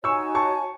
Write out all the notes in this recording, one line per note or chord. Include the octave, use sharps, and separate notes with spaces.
D#4 F#4 C#5 G#5 C#6 E6
A5 C#6